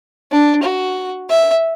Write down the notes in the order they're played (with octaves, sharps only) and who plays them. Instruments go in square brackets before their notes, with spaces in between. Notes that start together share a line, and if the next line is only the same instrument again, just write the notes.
[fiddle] D4
F#4
E5